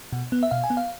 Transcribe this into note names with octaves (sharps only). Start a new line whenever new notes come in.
B2
B3
E5
B2 F5
G#5
B3
F5